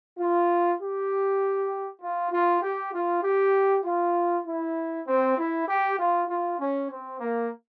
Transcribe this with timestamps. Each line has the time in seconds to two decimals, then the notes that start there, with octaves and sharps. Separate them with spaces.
0.18 F4
0.79 G4
2.01 F4
2.31 F4
2.62 G4
2.93 F4
3.23 G4
3.84 F4
4.46 E4
5.06 C4
5.37 E4
5.67 G4
5.98 F4
6.28 F4
6.59 C#4
6.90 C4
7.20 A#3